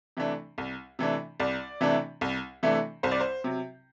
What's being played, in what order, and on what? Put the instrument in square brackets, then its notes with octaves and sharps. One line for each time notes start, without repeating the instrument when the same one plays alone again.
[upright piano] C3 E3 A3 D4
C2
C3 E3 A3 D4
C2 D5
C3 E3 A3 D4
C2
C3 E3 A3 D4
C2 C5
D5
C5
C3 F#3